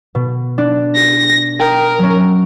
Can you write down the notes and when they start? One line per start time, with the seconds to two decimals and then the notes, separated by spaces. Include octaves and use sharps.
0.15 B2
0.58 D4 F#6
0.95 A#6
1.59 A#4 G5 D#6
1.99 F#3 C#4